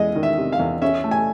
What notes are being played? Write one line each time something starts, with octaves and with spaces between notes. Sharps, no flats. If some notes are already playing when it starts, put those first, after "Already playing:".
Already playing: E2 G#3 D#5
D#3
E5
C3
F5
E2
C#4 E5
A3
G#5